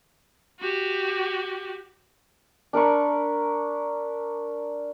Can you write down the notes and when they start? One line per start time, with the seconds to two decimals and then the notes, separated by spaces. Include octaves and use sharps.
0.60 F#4 G4
2.73 D4 A#4 B5 C#6